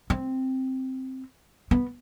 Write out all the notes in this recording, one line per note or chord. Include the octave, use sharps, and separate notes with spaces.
C4
B3